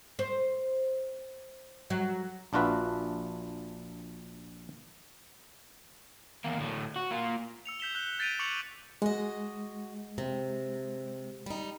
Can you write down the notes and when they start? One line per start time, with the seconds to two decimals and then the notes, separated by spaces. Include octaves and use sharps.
0.19 C5
1.90 F#3
2.53 A#1 D4 F4 F#4 B4 E5
6.44 E2 A#3
6.57 D2 A2
6.96 F#4
7.11 A#3 F4
7.66 E6 C#7 F7
7.80 G6 B6 E7 G7
7.95 F#6 G6 G7
8.19 G6 A6 B6 D7 D#7 F7
8.39 C#6 D6 F#6 C#7 F7 F#7
9.02 G#3 F#4 D#5
10.18 C3
11.46 G3 D#4